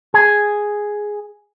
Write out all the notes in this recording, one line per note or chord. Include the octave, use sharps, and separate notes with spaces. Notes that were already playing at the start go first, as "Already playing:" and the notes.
G#4